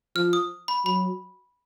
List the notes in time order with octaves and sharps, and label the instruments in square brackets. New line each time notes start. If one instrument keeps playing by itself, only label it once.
[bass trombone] F3 [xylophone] F6
[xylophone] D#6
B5
[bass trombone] F#3 [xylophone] B5